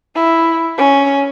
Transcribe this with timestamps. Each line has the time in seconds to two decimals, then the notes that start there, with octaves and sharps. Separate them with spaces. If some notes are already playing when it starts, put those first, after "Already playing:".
0.16 E4
0.78 C#4